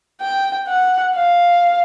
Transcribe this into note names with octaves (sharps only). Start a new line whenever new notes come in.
G5
F#5
F5